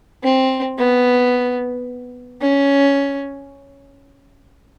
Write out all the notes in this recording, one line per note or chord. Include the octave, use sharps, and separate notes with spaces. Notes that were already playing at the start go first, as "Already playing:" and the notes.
C4
B3
C#4